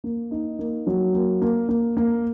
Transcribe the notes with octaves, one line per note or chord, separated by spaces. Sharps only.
A#3
D#4
A#3
F#3
A#3
A#3
A#3
A#3